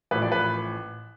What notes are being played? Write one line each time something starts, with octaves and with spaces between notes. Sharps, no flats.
A1 A2 F3 B4
D5
B4